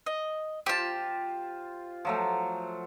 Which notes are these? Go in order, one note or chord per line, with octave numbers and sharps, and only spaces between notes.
D#5
F4 G4 C5 A5
F3 F#3 A3